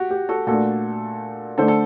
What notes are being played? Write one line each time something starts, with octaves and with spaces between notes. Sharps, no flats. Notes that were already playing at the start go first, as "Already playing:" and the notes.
Already playing: F#4 G4
G4
F#4 A4
A#2 A3 D4 F#4 A4
D3 A3 D4 A4 C5
A4